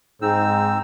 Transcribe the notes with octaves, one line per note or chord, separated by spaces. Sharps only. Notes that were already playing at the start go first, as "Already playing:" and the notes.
G#2 C4 D#4 E6